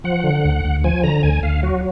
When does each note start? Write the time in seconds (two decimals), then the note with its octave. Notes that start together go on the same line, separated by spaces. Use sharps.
0.04 F3 F#5
0.24 D3
0.44 D2
0.64 D2
0.84 F3 G#5
1.03 D3 A#5
1.23 D2 G#5
1.43 D2 F5
1.63 F#3 F#4